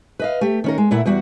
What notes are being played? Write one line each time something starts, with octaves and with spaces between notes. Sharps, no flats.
B4 D#5 F5
A3 G4
D#3 C#4 A#4
G#3
A#2 A3 E4 F#5
E2 G3 F#4 F#5